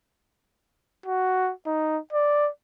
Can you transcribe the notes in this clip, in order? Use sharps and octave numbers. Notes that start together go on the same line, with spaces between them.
F#4
D#4
D5